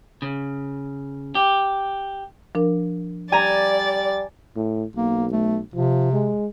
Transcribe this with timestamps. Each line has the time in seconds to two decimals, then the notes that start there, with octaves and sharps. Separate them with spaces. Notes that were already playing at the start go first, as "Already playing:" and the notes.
0.22 C#3
1.35 G4
2.55 F3 D4 A#4
3.32 G3 D5 G#5 A#5 A6
4.56 A2
4.96 B1 A#3
5.33 A3
5.74 C3 F3
6.13 G#3